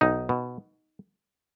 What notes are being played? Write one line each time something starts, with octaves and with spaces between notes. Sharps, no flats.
B1 D#4
B2